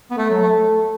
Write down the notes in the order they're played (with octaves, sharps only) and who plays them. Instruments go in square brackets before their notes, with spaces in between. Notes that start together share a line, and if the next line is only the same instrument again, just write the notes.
[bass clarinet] B3
[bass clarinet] A3 [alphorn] A4
[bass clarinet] F#3
A3